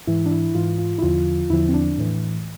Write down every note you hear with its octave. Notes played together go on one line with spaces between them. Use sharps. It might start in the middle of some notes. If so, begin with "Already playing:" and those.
G#2 E3 E4
D4
E4
G#2 E3 F4
F4
E4
E2 D3 F3 F4
E2 D3 F3 E4
C4
D4
A2 E3